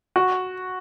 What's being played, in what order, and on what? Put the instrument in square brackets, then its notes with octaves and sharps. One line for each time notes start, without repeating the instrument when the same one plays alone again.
[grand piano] F#4